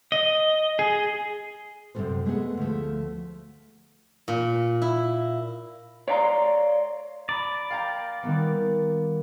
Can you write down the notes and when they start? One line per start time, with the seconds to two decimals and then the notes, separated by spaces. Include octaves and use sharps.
0.12 D#5
0.79 G#4
1.95 F#2 C3 D#3 F3 A4 C5
2.25 G#3 A3 B3 G#4 F#5
2.58 D2 F3 A3
4.28 A#2
4.82 E4
6.08 C#5 D5 F5 G#5 A#5 C6
7.29 D5 A#5 B5
7.70 F5 G5 A#5
8.23 D#3 G3 B3